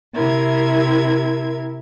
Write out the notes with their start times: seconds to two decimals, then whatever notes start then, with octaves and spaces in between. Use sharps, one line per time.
0.13 C3 E4 A#4 G#6